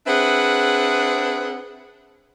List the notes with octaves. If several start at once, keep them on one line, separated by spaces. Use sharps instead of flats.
C4 D4 G#4 B4 E5 F#5